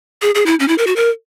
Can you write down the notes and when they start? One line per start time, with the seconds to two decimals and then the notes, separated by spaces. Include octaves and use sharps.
0.22 G#4
0.35 G#4
0.46 E4
0.60 C#4
0.68 E4
0.78 A#4
0.87 F#4
0.96 A#4